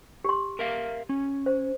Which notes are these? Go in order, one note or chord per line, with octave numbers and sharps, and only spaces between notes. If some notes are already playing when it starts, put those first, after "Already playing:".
G4 C6
A#4 E5 F5
C#4
C5